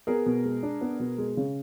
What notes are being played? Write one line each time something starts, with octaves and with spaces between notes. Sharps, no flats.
B3 G#4 A#4
B2
G#3
D4
B3
B2
G#3
C#3